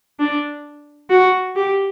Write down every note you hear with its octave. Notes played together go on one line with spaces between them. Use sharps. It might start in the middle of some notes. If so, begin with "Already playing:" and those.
D4
F#4
G4